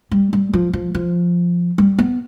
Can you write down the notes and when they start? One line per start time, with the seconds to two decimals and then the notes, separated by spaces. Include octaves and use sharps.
0.11 G3
0.33 G3
0.54 F3
0.73 F3
0.95 F3
1.78 G3
1.98 B3